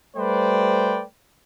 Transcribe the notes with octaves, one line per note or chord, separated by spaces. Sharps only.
G3 A3 B4 C5 D5 G5